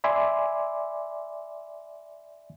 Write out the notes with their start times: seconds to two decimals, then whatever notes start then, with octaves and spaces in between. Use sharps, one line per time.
0.04 D5 E5 G#5 B5 C6 D6